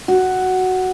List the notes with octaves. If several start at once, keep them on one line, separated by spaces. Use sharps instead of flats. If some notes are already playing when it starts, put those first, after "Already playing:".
F#4